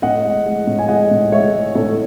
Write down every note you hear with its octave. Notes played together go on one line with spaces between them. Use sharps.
A2 D#5 F#5
G#3
G#3
A2
G#5
G#3 D#5 F#5
A2
G#3 C#5 E5
G#3
A2 A4 C#5